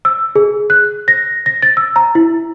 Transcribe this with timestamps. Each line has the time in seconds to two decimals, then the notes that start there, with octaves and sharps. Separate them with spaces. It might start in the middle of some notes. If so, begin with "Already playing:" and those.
0.05 E6
0.36 G#4
0.70 F#6
1.08 A#6
1.46 A#6
1.62 A6
1.77 E6
1.96 A#5
2.15 E4